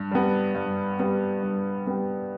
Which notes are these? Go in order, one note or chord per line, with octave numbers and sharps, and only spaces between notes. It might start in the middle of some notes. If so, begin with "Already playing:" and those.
Already playing: G2
G3 B3
G2
G3 B3
G2
G3 B3